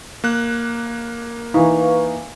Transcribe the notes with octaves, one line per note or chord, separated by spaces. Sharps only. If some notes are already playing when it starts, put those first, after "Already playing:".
A#3 F#6
E3 D#4 B4 F5 C#6